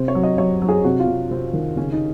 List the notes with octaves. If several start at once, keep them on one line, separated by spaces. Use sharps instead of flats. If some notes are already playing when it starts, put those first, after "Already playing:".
Already playing: C3 C5
C#5
F#3
D#5
F#3 C#5
F#3
G#4
C3 F#4
F4
C3
C3 C4
D#3
C#3 C#4
D#4